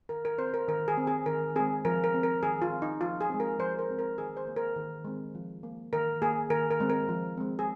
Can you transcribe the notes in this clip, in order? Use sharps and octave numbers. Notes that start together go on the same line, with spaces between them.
D#3 A#4
A#4
C4 C5
A#4
D#3 A#4
G#4
C4
G#4
D#3 A#4
G#3 C4 G#4
F3 A#4
A#4
C4
A#4
D#3 G#4
F4
C4
D#4
F3 F4
G#4
G#3 C4
A#4
F3 C5
A#4
G#3 C4
A#4
D#3 G#4
C5
A#3
A#4
D#3
G#3 C4
F3
A#3
D#3 A#4
A#3 G#4
D#3 A#4
A#4
G#3 C4
A#4
F3
G#3 C4
G#4